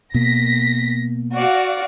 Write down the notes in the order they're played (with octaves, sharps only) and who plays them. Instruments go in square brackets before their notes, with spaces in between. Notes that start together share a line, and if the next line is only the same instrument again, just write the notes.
[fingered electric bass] B2 A#3 [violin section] A#6 B6
[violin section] F#4 D5 F5